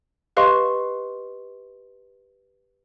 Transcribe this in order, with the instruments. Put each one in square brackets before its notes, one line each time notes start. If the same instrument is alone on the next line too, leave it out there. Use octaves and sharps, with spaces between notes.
[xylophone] G4 B4 D#5 F5 C6 C#6